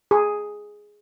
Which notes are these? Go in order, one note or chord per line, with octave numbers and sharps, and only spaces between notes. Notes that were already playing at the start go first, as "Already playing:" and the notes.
G#4